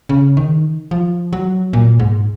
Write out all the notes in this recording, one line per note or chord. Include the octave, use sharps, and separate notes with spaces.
C#3
D#3
F3
F#3
A#2
G#2